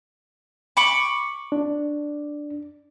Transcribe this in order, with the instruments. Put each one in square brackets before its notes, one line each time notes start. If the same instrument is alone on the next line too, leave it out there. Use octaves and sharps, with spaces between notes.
[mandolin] B5 C#6 D6
[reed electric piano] D4